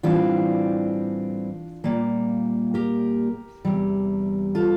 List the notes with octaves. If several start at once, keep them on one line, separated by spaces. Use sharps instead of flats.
A2 E3 G3 C4 D4 F4
A#2 G3 A#3
G4 A#4
E2 C3 G3
F4 A4